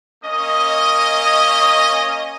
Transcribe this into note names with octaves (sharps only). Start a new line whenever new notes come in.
A#3 C#4 D#5